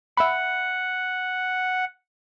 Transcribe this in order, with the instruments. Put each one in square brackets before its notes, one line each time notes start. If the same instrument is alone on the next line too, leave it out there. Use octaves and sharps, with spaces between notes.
[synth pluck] E5 B5 [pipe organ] F#5